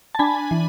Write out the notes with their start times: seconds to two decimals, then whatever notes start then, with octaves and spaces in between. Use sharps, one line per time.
0.15 A5
0.19 D4 G#5 B5
0.51 E3